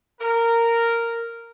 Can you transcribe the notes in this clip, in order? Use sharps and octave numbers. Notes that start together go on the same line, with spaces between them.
A#4